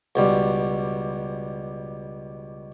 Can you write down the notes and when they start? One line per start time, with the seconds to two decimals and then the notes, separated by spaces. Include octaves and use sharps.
0.15 C#2 B2 G3